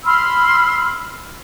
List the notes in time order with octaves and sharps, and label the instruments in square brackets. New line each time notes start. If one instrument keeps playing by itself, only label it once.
[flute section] B5 C6 E6 F6